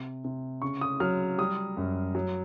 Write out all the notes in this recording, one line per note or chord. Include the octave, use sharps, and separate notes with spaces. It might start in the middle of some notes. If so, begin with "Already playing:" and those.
Already playing: C3
C3
C#3 C#6
D#6
F#3 F6
G3 D#6
F#2
F#3